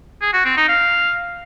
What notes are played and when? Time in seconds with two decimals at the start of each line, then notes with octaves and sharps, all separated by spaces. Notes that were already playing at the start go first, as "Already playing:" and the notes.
0.22 G#4
0.33 F#4
0.45 C4
0.57 D#4
0.68 F5